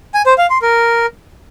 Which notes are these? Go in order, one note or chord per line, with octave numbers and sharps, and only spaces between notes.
G#5
C5
F5
C6
A#4